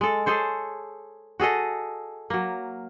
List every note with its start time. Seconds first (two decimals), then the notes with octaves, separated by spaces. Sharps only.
0.01 G#3 A4
0.26 G#4 A4 C5 C#5
1.40 F#4 G#4 A4 D#5
2.30 F#3 A#3